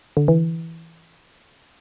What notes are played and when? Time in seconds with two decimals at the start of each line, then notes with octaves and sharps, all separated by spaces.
0.17 D3
0.28 E3